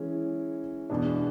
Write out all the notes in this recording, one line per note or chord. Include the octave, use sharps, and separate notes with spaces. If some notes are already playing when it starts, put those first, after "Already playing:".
Already playing: E3 G#3 C#4
E2 B2 G#3 B3 D4